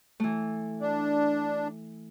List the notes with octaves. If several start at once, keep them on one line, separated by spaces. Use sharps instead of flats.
E3 A3
D4